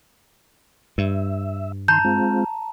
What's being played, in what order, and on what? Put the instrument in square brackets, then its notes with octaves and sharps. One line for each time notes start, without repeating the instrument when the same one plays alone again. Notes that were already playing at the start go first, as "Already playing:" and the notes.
[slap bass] G2 [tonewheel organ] E5
[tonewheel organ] D#3 C6 [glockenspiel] A5 A#5 [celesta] G6
[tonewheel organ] G#3 C4 F4